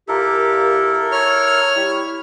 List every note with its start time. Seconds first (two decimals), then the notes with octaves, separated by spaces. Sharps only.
0.08 A#2 E4 G4 A4 A#4
1.12 C#5 F6
1.76 G3 E4